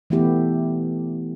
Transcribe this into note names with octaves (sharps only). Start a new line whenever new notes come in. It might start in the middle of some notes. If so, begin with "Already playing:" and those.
E3 A3 B3 E4 G4